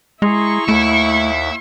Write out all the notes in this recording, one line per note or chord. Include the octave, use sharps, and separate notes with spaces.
G#3 E4 G#4 A#5 C6 C#6
D#2 A3 E5 B5